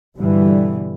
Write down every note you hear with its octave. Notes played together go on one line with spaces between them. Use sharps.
G2 B2 D3 E3 G3